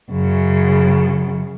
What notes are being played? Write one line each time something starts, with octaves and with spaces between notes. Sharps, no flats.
F#2 C#3